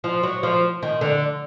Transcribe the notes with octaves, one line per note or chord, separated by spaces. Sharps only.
F3
F#3
F3
D#3
D3